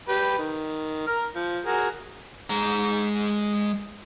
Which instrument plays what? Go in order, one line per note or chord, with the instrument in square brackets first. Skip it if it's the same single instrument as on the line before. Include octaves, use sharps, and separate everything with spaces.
[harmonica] G4 B4
D#3
A#4 F6
F3
F#4 G#4 A#4
[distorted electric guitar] G#3 A#5